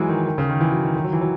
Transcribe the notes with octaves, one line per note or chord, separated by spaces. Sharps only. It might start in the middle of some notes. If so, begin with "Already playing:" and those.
Already playing: E3 F#3 G#3
D#3
D#3
C#3
D#3
E3
F#3
D#3
D#3
F#3
E3
F#3